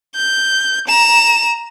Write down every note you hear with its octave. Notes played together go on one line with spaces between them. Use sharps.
G6
A#5 E7